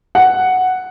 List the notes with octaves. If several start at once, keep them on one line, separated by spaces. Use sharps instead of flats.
F#5